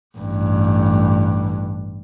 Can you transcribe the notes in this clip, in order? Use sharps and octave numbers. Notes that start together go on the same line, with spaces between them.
A1 G2